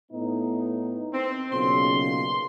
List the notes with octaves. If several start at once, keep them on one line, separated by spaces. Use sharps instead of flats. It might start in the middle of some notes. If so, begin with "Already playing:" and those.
A2 B3 D#4
C4
B1 A#2 C#3 C6